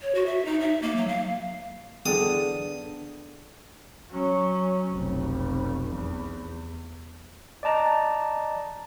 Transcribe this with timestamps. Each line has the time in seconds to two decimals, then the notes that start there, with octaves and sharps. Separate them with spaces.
0.01 C#5
0.15 F#4
0.27 E5
0.45 D#4
0.61 E5
0.82 A#3
0.96 F#3
1.08 F5
2.06 D3 E3 B3 G#4 G5 D#6
4.11 F#3 C#4
4.90 F1 B1
5.90 E2
7.63 D5 D#5 A5 A#5